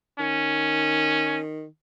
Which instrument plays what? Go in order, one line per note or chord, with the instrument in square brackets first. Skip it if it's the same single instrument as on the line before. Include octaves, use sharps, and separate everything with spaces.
[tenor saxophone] D#3 [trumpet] C#4